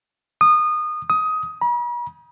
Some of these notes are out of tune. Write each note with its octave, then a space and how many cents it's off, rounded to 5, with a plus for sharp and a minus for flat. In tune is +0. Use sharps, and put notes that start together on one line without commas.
D#6 -25
D#6 +15
B5 -45